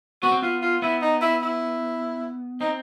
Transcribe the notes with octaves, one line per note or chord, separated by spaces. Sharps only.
B3 F#4
C4
B3 F4
F4
B3 E4
D#4
E4
E4
C4 D#4